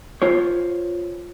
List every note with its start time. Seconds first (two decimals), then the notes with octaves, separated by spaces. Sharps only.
0.22 F4 C5 C#5